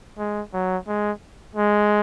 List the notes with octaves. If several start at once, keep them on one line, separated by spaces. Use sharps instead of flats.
G#3
F#3
G#3
G#3